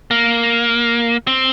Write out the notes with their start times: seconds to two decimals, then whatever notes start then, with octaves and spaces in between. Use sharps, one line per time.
0.11 A#3
1.27 C4